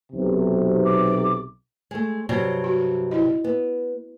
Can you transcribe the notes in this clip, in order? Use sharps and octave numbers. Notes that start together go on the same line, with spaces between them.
B1 C3
D6
G#3 A3
G2 C3 F#3
F#4
E4 D#5
B3